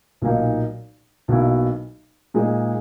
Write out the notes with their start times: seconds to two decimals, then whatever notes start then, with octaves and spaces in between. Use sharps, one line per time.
0.22 B1 A#2 A#3 D#4
1.28 B1 B2 A#3 E4
2.34 A#2 G#3 D#4 G#4